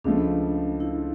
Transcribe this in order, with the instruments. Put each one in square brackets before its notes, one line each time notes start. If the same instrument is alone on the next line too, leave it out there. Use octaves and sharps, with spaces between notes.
[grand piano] C#2 C#3 F3 A3 [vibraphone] D4
[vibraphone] E4